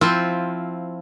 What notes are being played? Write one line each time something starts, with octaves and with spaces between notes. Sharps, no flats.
F3 C4 E4 F4